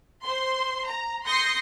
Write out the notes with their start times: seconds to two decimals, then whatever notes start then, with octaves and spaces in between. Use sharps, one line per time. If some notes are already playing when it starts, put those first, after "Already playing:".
0.23 C5 C6
0.87 A#5
1.25 C6 D#6 G6 A#6 C7 C#7